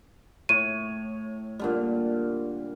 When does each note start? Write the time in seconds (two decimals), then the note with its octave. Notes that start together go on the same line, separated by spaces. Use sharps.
0.49 A2 C#5 D#7
1.59 A#2 D3 G3